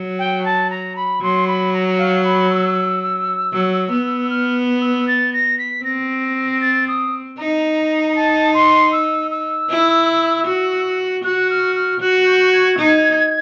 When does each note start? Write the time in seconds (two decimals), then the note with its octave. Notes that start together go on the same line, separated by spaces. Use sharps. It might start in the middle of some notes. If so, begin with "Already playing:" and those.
Already playing: F#3
0.19 G5
0.45 A5
0.70 A#5
0.96 B5
1.21 F#3 C6
1.47 B5
1.73 A#5
1.98 F5
2.24 B5
2.50 E6
3.53 F#3
3.91 B3
4.30 F6
4.81 E6
5.07 A6
5.33 A#6
5.58 B6
5.84 C4 A#6
6.61 A6
6.88 D#6
7.38 D#4 A#5
8.15 A5
8.54 C6
8.92 E6
9.31 E6
9.70 E4
10.47 F#4
11.24 F#4 F#6
11.50 F6
11.76 F6
12.00 F#4 F#6
12.26 G6
12.53 G#6
12.79 D#4